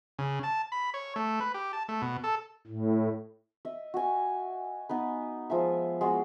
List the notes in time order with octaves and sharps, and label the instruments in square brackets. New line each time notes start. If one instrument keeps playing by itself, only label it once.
[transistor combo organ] C#3
A5
B5
C#5
A3
B4
G4
A5
A3
B2
A4
[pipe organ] A2
[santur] D#5 E5
F#4 G#5
B3 D#4 B4
F3 G#3 E5
G#3 B3 F#4